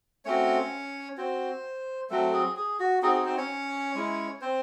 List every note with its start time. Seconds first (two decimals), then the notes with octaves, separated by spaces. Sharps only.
0.25 A3 C4 C#4 F#4 C#5
1.17 C4 F#4 C5
2.10 F#3 A3 C4 F#4 A4
2.33 G#4
2.56 G#4
2.79 F#4
3.03 C4 D#4 F#4 G#4
3.14 G#4
3.26 C4 C5
3.37 C#4 C#5
3.95 G#3 C#4 E4
4.41 C4 C5